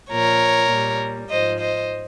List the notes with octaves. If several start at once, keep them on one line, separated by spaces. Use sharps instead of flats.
A#2 F3 A#4 C#5
A#2 G3
G#2 F3 C5 D#5
C5 D#5